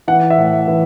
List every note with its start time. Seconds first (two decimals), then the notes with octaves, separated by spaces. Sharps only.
0.08 E3 F#5
0.30 E5
0.38 A2
0.68 E3